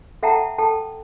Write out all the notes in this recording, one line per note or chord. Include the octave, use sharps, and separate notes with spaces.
A4 E5 F#5 G5 A5 A#5
A4 G5 A5